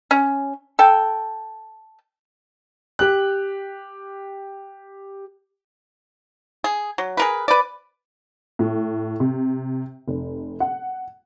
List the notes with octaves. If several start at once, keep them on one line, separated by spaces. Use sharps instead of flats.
C#4
A4 G5
G4 F#6
G#4
F#3
G#4 A#4 B4
B4 D5
A2
C3
F1
F#5